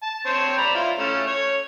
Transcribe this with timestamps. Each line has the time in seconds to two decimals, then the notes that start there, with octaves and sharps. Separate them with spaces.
0.03 A5
0.26 C4 C5 C#5
0.58 D5 A#5 B5
0.75 E4 F4
0.99 A3 C#4
1.27 C#5